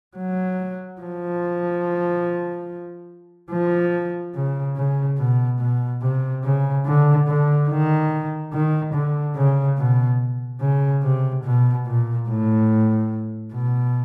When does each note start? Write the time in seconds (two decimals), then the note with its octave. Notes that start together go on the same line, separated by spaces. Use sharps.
0.17 F#3
1.01 F3
3.51 F3
4.35 C#3
4.77 C#3
5.18 B2
5.60 B2
6.03 C3
6.44 C#3
6.86 D3
7.27 D3
7.69 D#3
8.53 D#3
8.94 D3
9.37 C#3
9.78 B2
10.61 C#3
11.04 C3
11.44 B2
11.87 A#2
12.28 A2
13.54 B2